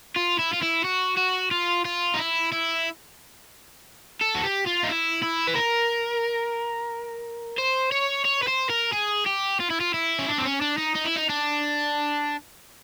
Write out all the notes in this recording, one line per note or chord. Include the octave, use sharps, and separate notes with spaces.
F4
E4
F4
E4
F#4
F#4
F4
F4
D#4
E4
E4
A4
F#4
G4
F4
D#4
E4
E4
B4
A#4
C5
C#5
C#5
B4
C5
A#4
G#4
G4
F4
E4
F4
E4
C#4
D4
C4
C#4
D4
D#4
D#4
E4
D#4
D4